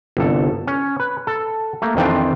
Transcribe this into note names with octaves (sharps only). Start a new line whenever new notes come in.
G1 C2 A4
C#4
B4
A4
A3 A#3
F2 D#3 E3 C4 D4 F4